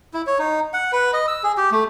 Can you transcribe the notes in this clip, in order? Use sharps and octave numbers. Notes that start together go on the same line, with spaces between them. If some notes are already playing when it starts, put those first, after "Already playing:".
E4
C#5
D#4
F#5
B4
D#5
E6
G#4
G4
A3